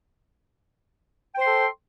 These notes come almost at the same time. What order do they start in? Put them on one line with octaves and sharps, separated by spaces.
G5 C5 C6 A4